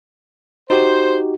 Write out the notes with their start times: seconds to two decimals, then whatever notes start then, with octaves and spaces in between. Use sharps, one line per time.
0.70 D#4 F#4 G4 C5